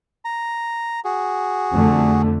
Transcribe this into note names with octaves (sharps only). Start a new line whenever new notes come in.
A#5
F#4 G#4
F2 D3 A3